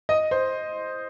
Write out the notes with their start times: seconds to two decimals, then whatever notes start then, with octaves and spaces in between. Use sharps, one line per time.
0.09 D#5
0.31 C5